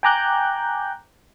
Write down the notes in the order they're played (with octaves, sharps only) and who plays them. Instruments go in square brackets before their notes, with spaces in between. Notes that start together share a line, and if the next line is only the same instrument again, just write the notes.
[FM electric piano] G5 G#5 A#5 D6 F#6 G6